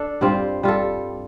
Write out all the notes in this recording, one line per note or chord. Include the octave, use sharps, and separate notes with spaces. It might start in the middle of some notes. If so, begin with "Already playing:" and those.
Already playing: D4 A4
G2 G3 C4 F4
G3 F4 A4